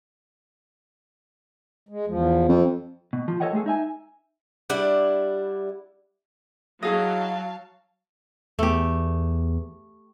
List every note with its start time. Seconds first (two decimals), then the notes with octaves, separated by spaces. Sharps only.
1.89 G#3
2.07 E2 F3
2.49 F2
3.13 B2
3.28 F3
3.40 A4 C5 C#5 D#5 F#5 G5
3.53 G#3 A3 F#4 G#4 A4
3.66 D#4 E5 G#5
4.70 G3 D4 E4 F#5
6.83 F#3 E4 G#4 D#5 F5 A5
8.59 E2 A3 G4